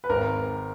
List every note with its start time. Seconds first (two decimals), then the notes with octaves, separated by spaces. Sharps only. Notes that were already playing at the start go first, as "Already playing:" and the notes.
0.04 B4
0.09 G#1 A#4